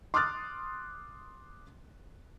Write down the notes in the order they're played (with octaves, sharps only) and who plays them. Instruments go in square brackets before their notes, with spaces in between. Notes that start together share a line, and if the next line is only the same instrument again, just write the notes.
[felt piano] C6 D6 D#6 F6 F#6 A6